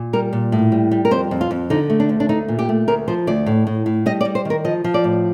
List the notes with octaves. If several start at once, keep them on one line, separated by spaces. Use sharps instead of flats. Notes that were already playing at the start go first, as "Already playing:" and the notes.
Already playing: A#2
G3 A#4
A#2
A2
G3
G3
A#4
F2 C5
F2
F4
F2
D3 D#4
A3
D4
D2
D4
A3 D#4
A#2
G4
A3
D2 A#4
F3 C5
D2 D5
A2
A2
A2
G3 D#5
D5
G3
C5
D#3 A#4
F3 D#5
F3
D5
A2